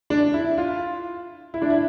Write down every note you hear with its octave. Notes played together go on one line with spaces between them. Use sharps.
D4
E4
F4
E4
D4
E4